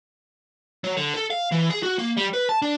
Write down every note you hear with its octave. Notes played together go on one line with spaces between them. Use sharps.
F#3
D3
A4
F5
E3
G#4
F#4
A#3
G3
B4
A5
D4